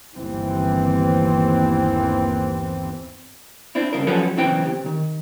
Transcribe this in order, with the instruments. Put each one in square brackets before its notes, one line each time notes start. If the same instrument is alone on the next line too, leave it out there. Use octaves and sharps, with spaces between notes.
[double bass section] G1 D#2 E3 C4
[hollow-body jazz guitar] C4 D4 E4
G2 C#3 A#4
F3 F#3 C#4 A4 B4
B1 C#3 E3 C4 G5
C3
D#3